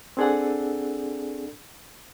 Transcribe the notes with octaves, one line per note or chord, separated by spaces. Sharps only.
C4 D4 G#4 A4 D5 F#5